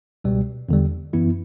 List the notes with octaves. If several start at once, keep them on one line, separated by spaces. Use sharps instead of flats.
C#2 B2 G3
E2 D3 G3
F#2 E3 B3 E4